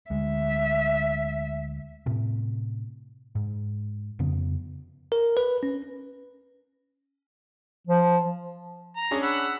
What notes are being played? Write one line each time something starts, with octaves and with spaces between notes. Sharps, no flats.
D2 G#3 E5
A2 C3
G#2
F2 C#3 B3
A#4
B4
C#4
F3
A#5
C#4 D4 G#4
F#5 B5 E6